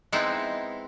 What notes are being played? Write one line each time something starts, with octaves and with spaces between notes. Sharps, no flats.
G#3 B3 C4 D#4 E4